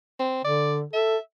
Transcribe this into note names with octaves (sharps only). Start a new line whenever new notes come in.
C4
D3 D5
A4 E5